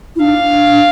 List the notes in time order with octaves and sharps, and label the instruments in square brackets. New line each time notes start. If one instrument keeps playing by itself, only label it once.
[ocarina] E4
[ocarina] D4 [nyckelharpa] F5